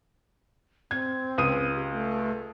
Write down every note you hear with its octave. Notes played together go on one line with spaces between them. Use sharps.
C4 G#6
C#2 D#6 D#7
G4
A3